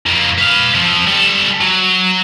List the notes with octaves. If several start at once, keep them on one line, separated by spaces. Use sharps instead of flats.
F2 A#3
B4 F5
F3 C4
G3 A4
F#3